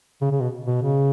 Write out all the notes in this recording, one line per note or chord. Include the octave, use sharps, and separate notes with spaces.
C#3
C#3
B2
B2
C#3